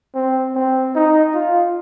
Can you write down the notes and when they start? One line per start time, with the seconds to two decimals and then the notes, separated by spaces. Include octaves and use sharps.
0.14 C4
0.55 C4
0.95 D#4
1.34 F4